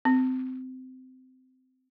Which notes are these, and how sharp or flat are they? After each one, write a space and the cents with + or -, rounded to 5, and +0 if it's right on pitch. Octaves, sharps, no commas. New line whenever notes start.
C4 -20